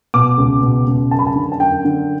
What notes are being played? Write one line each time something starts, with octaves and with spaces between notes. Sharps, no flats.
B2 D6
C#2
B2
C#2
F#2 A5
B5
A5
D3
A5
F#2 G5
D3